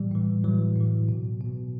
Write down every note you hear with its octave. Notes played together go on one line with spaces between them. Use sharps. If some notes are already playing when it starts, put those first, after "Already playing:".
Already playing: A2 E3 G3
A2 E3
A2 E3 F#3
A2
E3
B2
B2